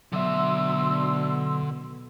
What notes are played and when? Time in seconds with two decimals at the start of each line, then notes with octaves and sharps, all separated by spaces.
0.12 B2 D3 F#3 E5 C6 E6